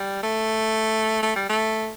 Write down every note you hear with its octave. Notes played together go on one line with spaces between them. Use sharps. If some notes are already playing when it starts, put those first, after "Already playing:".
Already playing: G3
A3
A3
G3
A3